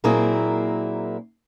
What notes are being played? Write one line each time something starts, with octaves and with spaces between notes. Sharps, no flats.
A#2 F#3 A#3 C4 E4 G#4